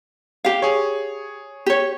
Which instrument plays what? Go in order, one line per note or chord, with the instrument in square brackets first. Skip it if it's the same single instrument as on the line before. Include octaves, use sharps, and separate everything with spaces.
[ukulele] G4 F5
[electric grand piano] G#4 C#5
[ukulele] G4 C#5